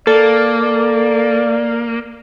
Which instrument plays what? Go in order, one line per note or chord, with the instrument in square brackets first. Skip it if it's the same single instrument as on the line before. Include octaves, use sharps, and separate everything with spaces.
[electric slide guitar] A#3 [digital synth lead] A4 [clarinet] D5
[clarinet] D5